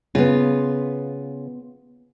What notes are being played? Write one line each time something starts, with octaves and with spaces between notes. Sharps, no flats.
C#3 B3 F4